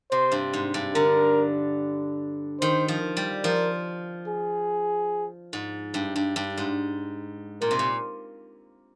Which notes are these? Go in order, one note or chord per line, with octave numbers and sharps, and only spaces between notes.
C3 C5
G2
G#2
G2
D3 A#4
D#3 C5
F3
G3
F3 A#4
G#4
G#2
G2
G2
G2
G#2
A#2 A#4
C3
A#2